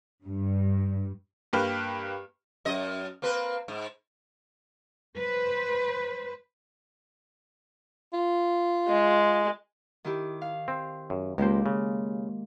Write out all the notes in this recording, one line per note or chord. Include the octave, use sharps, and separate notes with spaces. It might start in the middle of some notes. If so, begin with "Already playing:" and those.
G2
G2 A#3 B4 G5 F6
F#2 D#5
A#3 C4 B4
G#2
B4 C5
F4
G#3
D#3 E4 G4
F5
C4
F#2
C#2 G#3 A#3 G4 C5
C#3